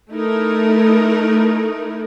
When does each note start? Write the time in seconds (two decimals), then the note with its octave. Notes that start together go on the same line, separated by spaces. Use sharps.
0.11 A3 D#4 E4 A#4